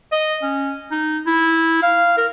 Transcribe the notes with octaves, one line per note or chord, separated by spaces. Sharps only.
D#5
C#4
D#4
E4
F5
A#4